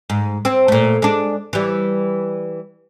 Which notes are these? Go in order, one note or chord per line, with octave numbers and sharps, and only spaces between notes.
G#2
C4
A#2 A3
G#3 D4
E3 G3